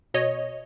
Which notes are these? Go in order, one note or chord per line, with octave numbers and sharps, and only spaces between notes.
B2 C#5 D#5